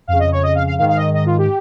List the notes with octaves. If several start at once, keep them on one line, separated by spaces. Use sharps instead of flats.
F2 C#3 F5
D#5
C#5
D#5
F5
F5
G#2 D#3 F5
F5
D#5
D#5
F4
G4